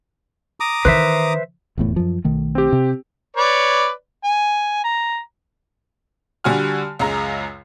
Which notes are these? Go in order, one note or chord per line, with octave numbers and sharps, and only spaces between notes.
A#5 D6 D#6
D#3 E3 B4 C5 E5
F1 E2 A2
F#2 F3
B1 D#3 A3
C4 G4
C3
B4 C#5 D5
G#5
A#5
D3 G3 F#4 G#5 F6
C#2 F#2 G#3 A#5